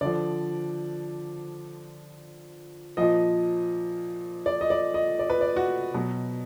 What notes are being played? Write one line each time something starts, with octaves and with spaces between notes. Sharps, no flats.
D3 F3 D5
A#2 F3 D#5
D5
D#5
D5
D#5
D5
B4
D5
F#4
B2 F#3